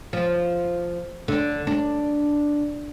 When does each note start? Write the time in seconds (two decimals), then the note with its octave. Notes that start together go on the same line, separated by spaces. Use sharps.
0.13 F3
1.28 D3
1.67 D4